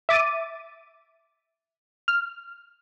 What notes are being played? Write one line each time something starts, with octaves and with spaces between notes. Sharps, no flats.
E5 D6 A6 D#7
F6